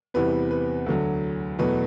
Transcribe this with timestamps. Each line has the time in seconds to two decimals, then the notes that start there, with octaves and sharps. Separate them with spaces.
0.14 E2 C3 E3 G3 B3 B4
0.51 B4
0.86 D2 D3 F#3
1.59 E2 B2 F#3 A3 B4